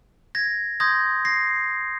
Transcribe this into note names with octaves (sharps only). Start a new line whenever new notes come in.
G#6 A#6
C6 D#6 G6 G#6 A#6
A#6 C7